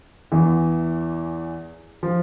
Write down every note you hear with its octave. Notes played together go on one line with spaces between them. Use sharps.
E2 E3
F3